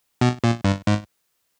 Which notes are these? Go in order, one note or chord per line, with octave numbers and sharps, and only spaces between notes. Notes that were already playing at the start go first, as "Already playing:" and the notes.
B2
A#2
G2
G#2